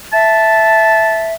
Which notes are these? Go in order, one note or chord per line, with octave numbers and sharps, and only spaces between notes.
E5 A5